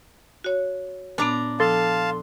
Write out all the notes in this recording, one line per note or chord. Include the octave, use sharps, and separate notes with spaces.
F#4 C#5
A#2 B3 D4 A#5
F3 A4 F5 A5 C6